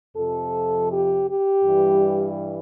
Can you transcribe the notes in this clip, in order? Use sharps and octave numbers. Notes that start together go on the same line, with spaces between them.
F2 C3 F3 A4
G4
G4
G2 E3 G3